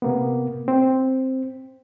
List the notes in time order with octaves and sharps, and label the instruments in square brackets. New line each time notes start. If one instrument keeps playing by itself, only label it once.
[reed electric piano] C3 A#3 B3
C4